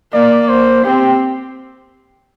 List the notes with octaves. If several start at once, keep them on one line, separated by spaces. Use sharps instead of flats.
A#3 D5
C5
C4 G4